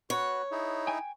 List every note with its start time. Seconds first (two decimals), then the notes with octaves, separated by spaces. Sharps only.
0.10 F#4 B4 C#5
0.52 D#4 E4 G#4
0.87 G5 G#5